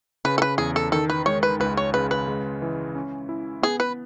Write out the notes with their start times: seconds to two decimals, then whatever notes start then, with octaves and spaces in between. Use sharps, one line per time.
0.25 C#3 B4
0.38 A4
0.42 B4
0.58 E2 G#4
0.76 A4
0.92 D#3 A4
1.10 B4
1.26 G#3 C#5
1.43 B4
1.60 C#2 B4
1.77 C#5
1.94 C#3 B4
2.11 B4
2.28 G#3
2.62 E3
2.95 C#4
3.29 E4
3.62 B3 G#4
3.80 B4